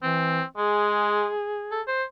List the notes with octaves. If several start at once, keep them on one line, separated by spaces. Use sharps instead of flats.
E3 C4
G#3 G#4
A4
C5